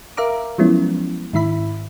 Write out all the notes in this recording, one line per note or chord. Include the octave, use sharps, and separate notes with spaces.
A#4 E5 F5 A#5 D6
F3 F#3 G#3 B3 C#4 E4
G#2 D#3 E4 E5 B5